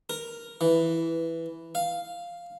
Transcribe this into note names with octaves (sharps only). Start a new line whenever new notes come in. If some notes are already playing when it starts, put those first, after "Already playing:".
A#4
E3
F5